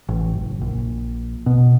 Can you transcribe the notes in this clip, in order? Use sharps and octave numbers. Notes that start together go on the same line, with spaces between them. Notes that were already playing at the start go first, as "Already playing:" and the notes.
A1
F#1
A#1
B2